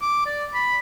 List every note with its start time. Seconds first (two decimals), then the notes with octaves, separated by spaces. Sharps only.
0.02 D6
0.26 D5
0.54 B5